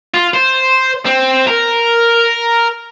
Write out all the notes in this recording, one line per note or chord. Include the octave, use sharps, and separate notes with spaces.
F4
C5
C4
A#4